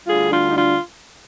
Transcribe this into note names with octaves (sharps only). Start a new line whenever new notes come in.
D2 D3 G3 F4 G#4
D4 F4
D#4
D4 F4